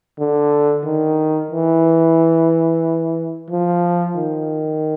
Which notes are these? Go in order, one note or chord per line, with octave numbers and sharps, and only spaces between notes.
D3
D#3
E3
F3
D#3